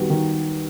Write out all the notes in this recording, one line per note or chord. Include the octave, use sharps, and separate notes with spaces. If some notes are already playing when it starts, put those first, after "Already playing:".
Already playing: D#3 G3 B3 F#4
D#3